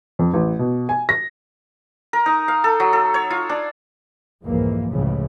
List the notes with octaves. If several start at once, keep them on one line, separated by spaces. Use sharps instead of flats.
F2
A1
B2
G#5
A#6
A#4
D#4
F5
A4
F#3
A4
C#5
F4
D4
C2 F2 G#2 E3 F3 A#3
F1 C#2 A2 C#3 E3 F3